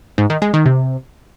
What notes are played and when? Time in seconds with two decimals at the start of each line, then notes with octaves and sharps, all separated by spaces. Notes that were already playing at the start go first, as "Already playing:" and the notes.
0.18 G#2
0.30 D#3
0.42 G#3
0.54 D#3
0.65 C3